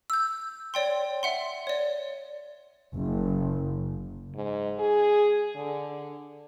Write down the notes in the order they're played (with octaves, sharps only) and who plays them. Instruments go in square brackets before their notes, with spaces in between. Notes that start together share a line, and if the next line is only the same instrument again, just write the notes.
[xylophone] E6 G6
C#5 D5 G5 C6
E5 F#5 C6
C#5 D5
[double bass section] F#1
[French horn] G#2
G#4
D3